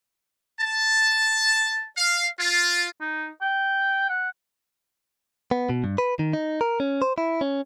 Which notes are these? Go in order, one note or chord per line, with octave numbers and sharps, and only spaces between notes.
A5
F5
F4
D#4
G5
F#5
B3
B2
G2
B4
D#3
D#4
A#4
C#4
C5
E4
C#4